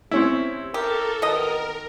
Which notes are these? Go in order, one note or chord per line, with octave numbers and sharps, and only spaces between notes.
C3 C4 C#4 E4
G4 A4 A#4
B2 D#3 A#4 D#5